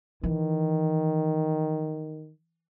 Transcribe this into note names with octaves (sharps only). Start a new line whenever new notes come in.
D#3 E3